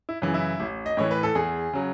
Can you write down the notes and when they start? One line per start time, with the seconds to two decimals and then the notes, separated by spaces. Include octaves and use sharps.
0.09 E4
0.22 F#2 C#3 E3
0.34 E4
0.60 A1
0.86 D#5
0.97 A2 E3 C#5
1.11 B4
1.23 A4
1.35 E2 G#4
1.73 C#3 F#3